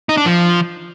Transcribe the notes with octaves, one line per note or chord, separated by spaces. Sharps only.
D#4
D4
F3